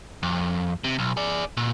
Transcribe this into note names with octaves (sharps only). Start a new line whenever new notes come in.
F2
C3
B1
G#4 D5
A#2